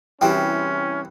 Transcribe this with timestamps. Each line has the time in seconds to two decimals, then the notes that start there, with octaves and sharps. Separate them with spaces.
0.21 C2 E3 C4 C#4 F#4 G4 G5